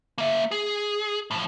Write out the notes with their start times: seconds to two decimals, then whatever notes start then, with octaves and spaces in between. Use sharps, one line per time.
0.18 A#3 E5
0.51 G#4
1.31 A2 F3